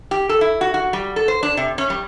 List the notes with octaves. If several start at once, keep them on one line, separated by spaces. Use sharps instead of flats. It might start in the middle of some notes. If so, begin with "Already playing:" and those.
G4
A4
E4
F#4
F#4
G3
A4
C5
D4
C3
C#4
G3